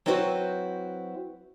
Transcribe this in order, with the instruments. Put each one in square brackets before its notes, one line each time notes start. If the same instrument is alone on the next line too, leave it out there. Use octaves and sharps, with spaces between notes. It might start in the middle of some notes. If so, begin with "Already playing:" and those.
[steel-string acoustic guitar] F#3 C4 E4 F#4 B4 C5